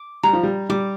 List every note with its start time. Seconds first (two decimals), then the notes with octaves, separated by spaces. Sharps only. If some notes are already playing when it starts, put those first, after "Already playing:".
Already playing: D6
0.23 G3 A#5
0.33 F3
0.43 G3
0.69 G3 D6